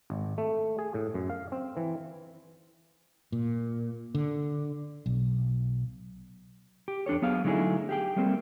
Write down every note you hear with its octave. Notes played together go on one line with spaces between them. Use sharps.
G#1
A3
G#4
A2
F#2
F5
C4
E3
A#2
D3
B1
G4
E2 D4 A4 C#5
F#3 B3 G#4 F5
D3 F#3 A3 D#4 E4 G#4
G4 G#4 G5
G3 A3 A#3 C4